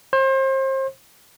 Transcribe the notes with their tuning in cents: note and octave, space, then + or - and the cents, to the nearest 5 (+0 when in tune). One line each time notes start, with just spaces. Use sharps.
C5 +35